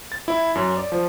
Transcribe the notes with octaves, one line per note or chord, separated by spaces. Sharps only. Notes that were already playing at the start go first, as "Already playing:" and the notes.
A6
E4
F#2
D5
F3